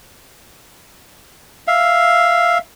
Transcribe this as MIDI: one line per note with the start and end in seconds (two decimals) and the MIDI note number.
1.67 2.58 76
1.67 2.58 77